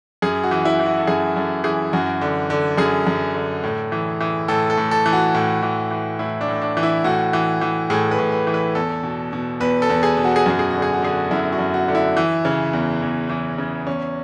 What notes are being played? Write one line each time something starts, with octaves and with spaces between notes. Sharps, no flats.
F#2 G#4
F#4
E3
E4
E3
F#4
A4
F#2 G#4
F#2 A4
E3 G#4
F#2 F#4
D3
D3
F#2 G#4
F#2
D3
A2
E3
E3
A2 A4
A4
A2
A4
E3
F#4
A2
E3
E3
A2 E4
D4
A2
D4
E3
E4
A2 F#4
E3
E3
A2 G#4
B4
A2
B4
E3
B4
E2 A4
B2
B2
E2 B4
A4
E2
G#4
B2
F#4
G#4
F#2 F#4
G#4
D3 F#4
G#4
F#4
D3 G#4
F#4
F#2 E4
F#4
F#2
F#4
D3
E4
E3
C#3
E2
E2
E3
C#3
E2 C#4